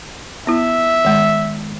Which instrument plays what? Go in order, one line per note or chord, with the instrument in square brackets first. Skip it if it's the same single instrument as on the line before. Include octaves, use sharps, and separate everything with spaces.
[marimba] B3 E4 [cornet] E5
[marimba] D#3 G#3